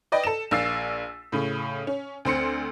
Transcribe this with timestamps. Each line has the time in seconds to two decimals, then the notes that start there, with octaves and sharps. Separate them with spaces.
0.12 B4 D5 D#5 G5
0.24 A4 E7
0.51 A#1 A#3 E6 A6 C7
1.32 A2 C#3
1.87 C#4
2.25 D2 C4 C6 C#7